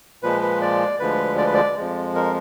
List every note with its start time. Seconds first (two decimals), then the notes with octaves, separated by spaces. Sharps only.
0.23 A#2 F3 G#3 B4
0.41 B4
0.61 D5
1.00 D2 D3 F3 G#3 B4
1.38 D5
1.46 B4
1.54 D5
1.77 F2 F3 G#3
2.15 A#4